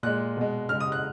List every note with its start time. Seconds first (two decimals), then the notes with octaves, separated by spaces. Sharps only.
0.03 A#2 G#3 F#6
0.37 B2 G#3
0.69 C#3 G#3 F6
0.80 D#6
0.92 F#6